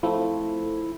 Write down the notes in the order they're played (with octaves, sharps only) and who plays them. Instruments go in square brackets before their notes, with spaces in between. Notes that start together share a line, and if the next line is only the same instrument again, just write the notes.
[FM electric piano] F3 A3 C4 [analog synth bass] E4